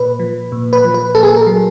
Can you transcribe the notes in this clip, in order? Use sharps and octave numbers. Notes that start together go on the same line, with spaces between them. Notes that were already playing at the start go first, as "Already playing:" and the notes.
Already playing: A#2 B4
F3
A#2
B4
F3
B4
A#2 A4
G#4
A4
A#4
F#3